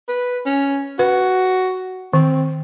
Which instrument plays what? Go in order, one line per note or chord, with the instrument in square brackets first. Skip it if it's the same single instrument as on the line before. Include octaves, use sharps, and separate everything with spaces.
[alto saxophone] B4
C#4
[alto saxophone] F#4 [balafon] B4
[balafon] D#3 [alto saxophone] C4